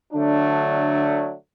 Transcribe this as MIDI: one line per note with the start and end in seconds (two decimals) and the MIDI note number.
0.13 1.34 50
0.13 1.34 54
0.13 1.34 57
0.13 1.34 62